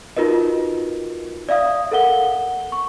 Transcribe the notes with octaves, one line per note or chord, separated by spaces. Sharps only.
D#4 F4 F#4 A#4 B4 D#5
D5 E5 F5 D#6
A4 A#4 F#5 G7
C#6